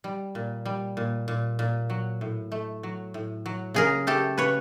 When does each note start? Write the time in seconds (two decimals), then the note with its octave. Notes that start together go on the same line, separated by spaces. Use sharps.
0.04 G3
0.35 A#2
0.66 G3
0.97 A#2
1.28 A#2
1.59 A#2
1.90 F#3
2.21 A2
2.52 A3
2.83 F#3
3.14 A2
3.46 F#3
3.74 C#3 G#4 A#4
4.07 A3 G4 A4
4.38 C#3 B4 C#5